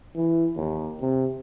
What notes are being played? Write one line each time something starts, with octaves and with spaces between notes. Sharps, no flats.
E3
D#2
C3